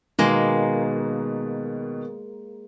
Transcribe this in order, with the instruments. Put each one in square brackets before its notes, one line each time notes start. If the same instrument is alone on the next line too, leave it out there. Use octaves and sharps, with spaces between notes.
[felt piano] B2 D#3 B3 [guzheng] G#3 A#3